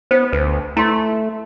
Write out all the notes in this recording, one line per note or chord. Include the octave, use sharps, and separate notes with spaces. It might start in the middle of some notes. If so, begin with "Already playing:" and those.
B3 C5
D2 B4
A3 E4 C6